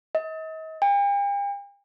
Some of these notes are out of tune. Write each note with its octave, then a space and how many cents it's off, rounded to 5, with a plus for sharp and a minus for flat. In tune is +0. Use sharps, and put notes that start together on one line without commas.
D#5 +40
G5 +45